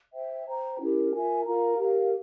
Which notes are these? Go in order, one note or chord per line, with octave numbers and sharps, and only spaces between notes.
C5 E5 G5
C5 G5 A#5
C#4 E4 G4 A#4
F4 A#4 E5 G#5
F4 A#4 F5 A#5
G4 A#4 F5